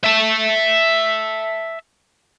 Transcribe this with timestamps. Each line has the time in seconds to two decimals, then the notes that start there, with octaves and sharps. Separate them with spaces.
0.04 E5 A5